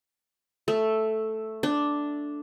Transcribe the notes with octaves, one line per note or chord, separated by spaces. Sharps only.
A3
D4